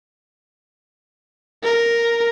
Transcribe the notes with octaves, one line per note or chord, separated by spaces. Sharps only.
A#4